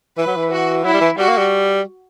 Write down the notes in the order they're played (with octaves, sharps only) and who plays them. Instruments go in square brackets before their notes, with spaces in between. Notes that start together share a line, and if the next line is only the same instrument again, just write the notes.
[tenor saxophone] E3 [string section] B4
[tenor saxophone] F#3
E3
[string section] F#4
[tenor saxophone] F#3 [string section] E4
[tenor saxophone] G3
E3
[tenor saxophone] G3 [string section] F#4
[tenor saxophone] A#3
G3